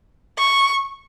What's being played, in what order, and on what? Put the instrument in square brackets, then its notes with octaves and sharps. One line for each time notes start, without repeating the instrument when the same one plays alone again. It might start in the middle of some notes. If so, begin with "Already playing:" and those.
[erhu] C#6